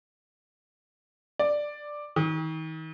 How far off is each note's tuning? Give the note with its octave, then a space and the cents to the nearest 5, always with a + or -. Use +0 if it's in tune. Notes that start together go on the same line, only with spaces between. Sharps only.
D5 +5
D#3 +40